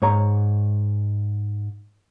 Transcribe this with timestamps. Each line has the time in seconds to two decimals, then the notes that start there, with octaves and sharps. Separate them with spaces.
0.02 G#2 C#5 A#5